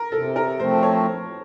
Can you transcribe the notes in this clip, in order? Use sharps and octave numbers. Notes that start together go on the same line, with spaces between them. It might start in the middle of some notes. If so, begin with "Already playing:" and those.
Already playing: A#4
C3 A4
A#4
F3 A3 C4 C5
C#5